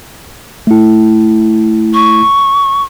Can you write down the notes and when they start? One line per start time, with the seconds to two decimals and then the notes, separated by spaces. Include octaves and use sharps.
0.67 A3 E4
1.94 C#6